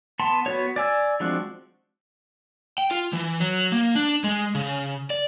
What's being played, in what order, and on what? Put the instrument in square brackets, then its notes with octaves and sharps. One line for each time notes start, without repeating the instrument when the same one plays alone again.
[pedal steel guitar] B3 A5 C6
B3 F#4 C#5
D5 G#5 E6
F3 G#3 C4 D4 F#4
[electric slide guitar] G5
F4
E3
F#3
A#3
D4
G#3
C#3
D5